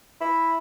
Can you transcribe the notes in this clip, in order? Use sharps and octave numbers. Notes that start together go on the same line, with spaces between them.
E4